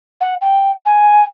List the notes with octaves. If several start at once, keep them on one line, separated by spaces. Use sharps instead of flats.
F#5
G5
G#5